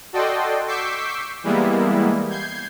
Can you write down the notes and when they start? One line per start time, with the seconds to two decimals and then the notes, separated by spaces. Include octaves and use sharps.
0.13 F#4 A4 D5 D#5 G5 C6
0.67 C#6 D6 E6 G6 B6 C7
1.43 E3 G3 G#3 A#3 B3 E4
2.29 G6 G#6 C7